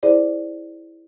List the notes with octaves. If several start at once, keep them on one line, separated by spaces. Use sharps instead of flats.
E4 G#4 C5 D5